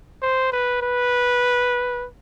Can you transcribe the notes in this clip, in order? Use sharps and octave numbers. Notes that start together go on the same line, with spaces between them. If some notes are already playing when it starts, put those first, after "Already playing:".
C5
B4
B4